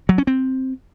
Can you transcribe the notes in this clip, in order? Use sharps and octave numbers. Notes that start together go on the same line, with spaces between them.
F#3
C#4
C4